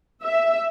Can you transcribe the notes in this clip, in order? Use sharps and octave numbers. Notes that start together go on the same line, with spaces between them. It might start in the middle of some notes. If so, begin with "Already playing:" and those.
E5